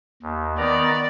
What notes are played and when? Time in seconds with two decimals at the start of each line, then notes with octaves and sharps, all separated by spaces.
0.23 D#2
0.58 D#3 B3 D5 A#5